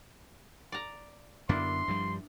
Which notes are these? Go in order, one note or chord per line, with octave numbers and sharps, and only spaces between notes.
D5 A#5
F#2 D3 A#3 B3 D4 E4 C6
G2 F3 G3